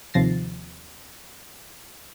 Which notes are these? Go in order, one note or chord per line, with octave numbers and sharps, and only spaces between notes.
D#2 C3 F3 A6 A#6 C7